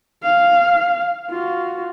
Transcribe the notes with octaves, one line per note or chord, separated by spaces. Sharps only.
F5
F4 F#4